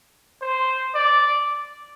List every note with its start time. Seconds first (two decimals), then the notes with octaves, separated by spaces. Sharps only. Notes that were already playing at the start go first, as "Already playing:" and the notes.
0.42 C5
0.95 D5